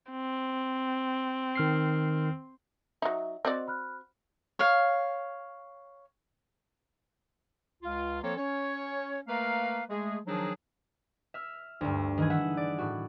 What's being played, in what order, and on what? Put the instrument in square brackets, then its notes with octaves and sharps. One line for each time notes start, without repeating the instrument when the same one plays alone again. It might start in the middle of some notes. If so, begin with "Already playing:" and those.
[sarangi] C4
[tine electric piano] D#3 F6 C7
[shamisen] F#3 D#4 [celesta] E5
[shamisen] C4 F#4 D5 [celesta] D#5
[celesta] B5 F6 F#6
[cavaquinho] C#5 F5
[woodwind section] C#2 F4
F3 A#3 C4 A4 C#5
C#4 C#5
A3 A#3 A#4 B4 F5
G#3 A3 G#4
D#3 F3 F#3 D4 D#4 G#4
[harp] E5 F6
D2 G2
D#3 E3 G#4
E5 F#5
D5
A2 F#4